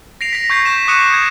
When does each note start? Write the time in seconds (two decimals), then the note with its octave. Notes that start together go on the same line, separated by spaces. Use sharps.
0.21 A#6 C7 D7 F7
0.33 A#6 B6
0.50 C#6 G6 G#6 C7
0.65 G6 B6 E7
0.88 D6 D#6 F#6 C#7 D#7 E7
1.14 G#6